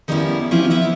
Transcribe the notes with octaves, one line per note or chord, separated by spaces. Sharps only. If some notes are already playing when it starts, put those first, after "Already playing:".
D#3 F3 G3 B3 C#4 E4
F3 C4 C#4 E4 F4 G4
B3 E4 E5